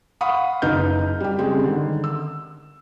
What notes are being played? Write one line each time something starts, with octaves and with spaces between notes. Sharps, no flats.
F5 F#5 B5 C#6 D#6
F#1 D#4 B4 F6 G6
G3 G4
C#3 G3 G#3 C4
D3 D#3
E6